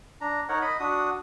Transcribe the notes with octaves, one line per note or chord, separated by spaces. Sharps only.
D4 A#5
D#4 A#4 C#5 F#5
D#5 B5
D4 F#4 D#6